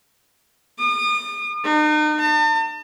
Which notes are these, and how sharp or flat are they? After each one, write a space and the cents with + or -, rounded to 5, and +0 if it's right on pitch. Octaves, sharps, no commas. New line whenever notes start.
D#6 -40
D#4 -40
A5 +40